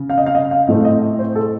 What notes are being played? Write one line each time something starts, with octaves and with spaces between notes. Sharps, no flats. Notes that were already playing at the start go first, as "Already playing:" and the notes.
Already playing: C#3
F5
D#5
F5
D#5
F5
A2 A3 C4 D#5
D#5
C5
A4